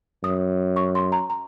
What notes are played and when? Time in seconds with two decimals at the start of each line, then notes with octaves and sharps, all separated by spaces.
0.23 F#2 D#6
0.76 C#6
0.95 C6
1.12 A#5
1.30 A#5